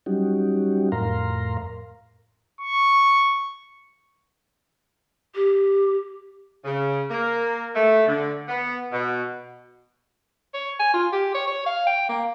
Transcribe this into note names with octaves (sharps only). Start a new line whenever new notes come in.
F#3 G3 C#4 D#4 F#4 G4
F2 A2 A#4 F5 A#5 C6
C#6
G4
C#3
A#3
A3
D3
B3
B2
C#5
G#5
F4
G4
C#5
C#5
F5
G5
A#3